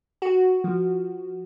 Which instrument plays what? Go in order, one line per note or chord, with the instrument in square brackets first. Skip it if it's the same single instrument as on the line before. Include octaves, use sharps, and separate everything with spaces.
[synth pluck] F#4
F3